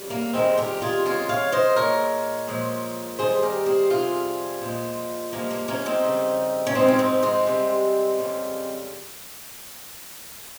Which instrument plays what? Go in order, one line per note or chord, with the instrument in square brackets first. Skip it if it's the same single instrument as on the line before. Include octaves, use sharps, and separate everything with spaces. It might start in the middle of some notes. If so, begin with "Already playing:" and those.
Already playing: [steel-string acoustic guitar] F2 C#3 G3
A#3
F2 D#3 G3 G#3 C4
G4 A#4
F4 G#4
F2 C#3 G#3 F4 G#4
C#5 F5
C5 D#5
A#2 G#3 A#4 C#5
A#2 F3 G#3
G2 D#3 G3 G#4 C5
G4 A#4
G#4 C5
F2 C3 G3 F4 G#4
A#2 F3 G#3
G2 F3 G#3 A#3
A#3
A#3 C#4
C4 D#4
F2 C#3 G3
C#4
G#2 F3 G#3 C4 D#4
C#4
C4 D#4
G#3 C4
C3 G3
F2 C#3 G3